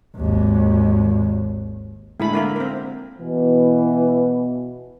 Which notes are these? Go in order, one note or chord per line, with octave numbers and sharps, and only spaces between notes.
G#1 D#2
A2 G#3 D4 E4 B5
D3 A#3 E4 A#4
C4 A#4
B2 E3